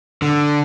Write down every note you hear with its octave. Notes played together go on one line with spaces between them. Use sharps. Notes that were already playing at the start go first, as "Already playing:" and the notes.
D3